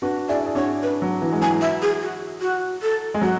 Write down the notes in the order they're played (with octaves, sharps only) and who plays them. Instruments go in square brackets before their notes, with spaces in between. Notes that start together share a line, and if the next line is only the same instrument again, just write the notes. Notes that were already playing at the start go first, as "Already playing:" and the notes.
[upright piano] D4 F#4 [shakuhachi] B4
[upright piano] E4 G#4 [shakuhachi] D5
[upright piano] G#4
[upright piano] D4 F#4 [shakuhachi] C#5
[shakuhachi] B4
[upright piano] F#3
E3
G#3
[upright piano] F#3 [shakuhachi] G#5
[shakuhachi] E5
G#4
F#4
F#4
A4
[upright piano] G#3
[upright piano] F#3 [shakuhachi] F#4